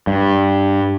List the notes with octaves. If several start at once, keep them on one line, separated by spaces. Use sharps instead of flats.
G2